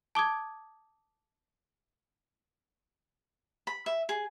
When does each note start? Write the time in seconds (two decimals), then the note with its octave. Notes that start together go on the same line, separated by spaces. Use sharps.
0.15 A5 D6 D#6 G#6
3.67 B5
3.86 E5
4.09 G#4